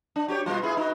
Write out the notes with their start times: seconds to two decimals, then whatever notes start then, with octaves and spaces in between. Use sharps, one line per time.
0.16 D4
0.28 F#4 G4 C#5
0.46 B2 G3 F4
0.62 B3 E4 G#4
0.77 D#4 F#4